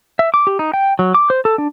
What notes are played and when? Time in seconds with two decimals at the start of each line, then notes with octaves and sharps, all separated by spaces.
0.19 E5
0.34 D6
0.47 G4
0.59 D#4
0.74 G5
0.99 F#3
1.14 D6
1.30 C5
1.45 A4
1.58 D4